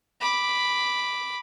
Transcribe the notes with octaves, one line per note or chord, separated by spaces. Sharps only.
B5 D6